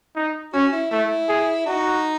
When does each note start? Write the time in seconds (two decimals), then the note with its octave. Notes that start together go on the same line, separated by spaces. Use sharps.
0.16 D#4
0.53 C#4 F#4
0.72 E4
0.91 A3 E4
1.29 G#4
1.66 D#4 F#4